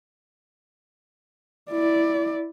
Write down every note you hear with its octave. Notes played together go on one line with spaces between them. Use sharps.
E4 D5